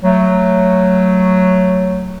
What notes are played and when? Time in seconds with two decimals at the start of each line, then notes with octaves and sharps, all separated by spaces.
0.03 F#3 A3